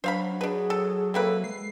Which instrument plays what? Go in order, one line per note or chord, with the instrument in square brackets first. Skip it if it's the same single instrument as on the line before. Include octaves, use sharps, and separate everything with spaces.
[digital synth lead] F#3 [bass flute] D4 [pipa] C5 F5 B5
[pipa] D4 B4 [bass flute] G#4
[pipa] A4
[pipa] C3 A#3 B4 [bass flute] A4
[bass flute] G#3 [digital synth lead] C7